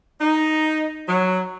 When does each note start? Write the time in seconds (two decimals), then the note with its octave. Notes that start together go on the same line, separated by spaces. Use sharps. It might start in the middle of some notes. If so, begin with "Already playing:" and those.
0.21 D#4
1.09 F#3